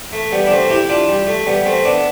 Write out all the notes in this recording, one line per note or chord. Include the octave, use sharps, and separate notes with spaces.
A3
G3 B3
D4
A3 C4
E4 G4
D4 F4
G3
A3
G3 B3
A3 C4
B3 D4